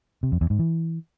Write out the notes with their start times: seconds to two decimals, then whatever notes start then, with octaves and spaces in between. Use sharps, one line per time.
0.23 C3
0.32 F2
0.41 E2
0.50 G#2
0.59 E3